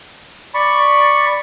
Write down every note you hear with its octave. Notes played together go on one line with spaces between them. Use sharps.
D5 B5 C#6